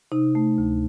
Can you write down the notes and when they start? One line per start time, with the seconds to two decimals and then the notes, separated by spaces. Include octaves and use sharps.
0.12 C3 D#4
0.35 A3
0.58 D2